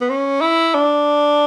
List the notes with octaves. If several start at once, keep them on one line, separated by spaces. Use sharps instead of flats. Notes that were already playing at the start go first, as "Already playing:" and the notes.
B3
C#4
E4
D4